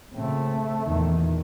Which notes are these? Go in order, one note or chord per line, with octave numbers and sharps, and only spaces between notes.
A#2 C#3 A3 C4
E2 A#2 D#3